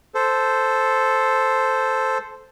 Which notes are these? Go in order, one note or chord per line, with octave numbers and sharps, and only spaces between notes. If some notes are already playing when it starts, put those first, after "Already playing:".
A4 C5